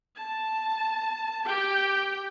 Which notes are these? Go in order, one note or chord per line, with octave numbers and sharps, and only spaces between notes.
A5
G4 G5